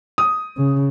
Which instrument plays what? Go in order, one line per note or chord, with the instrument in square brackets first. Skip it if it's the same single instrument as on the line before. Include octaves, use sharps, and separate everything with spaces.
[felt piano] D#6
[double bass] C#3